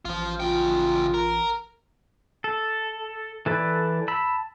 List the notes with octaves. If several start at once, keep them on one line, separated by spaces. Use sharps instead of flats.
A1 F3 F4
C#3 F4 G5
A#4
A4
E3 A4 B4 D5
A5 B5 E6